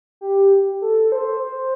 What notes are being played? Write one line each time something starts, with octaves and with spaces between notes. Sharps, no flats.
G4
A4
C5
C5